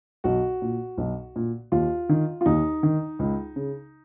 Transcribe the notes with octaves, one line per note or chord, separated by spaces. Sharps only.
B1 F#4
A#2
B1
A#2
D#2 F4
D#3
F4
D#2 D#4
D#3
C#2
C#3